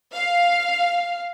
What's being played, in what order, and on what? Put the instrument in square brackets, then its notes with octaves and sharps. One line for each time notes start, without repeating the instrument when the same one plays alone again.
[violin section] F5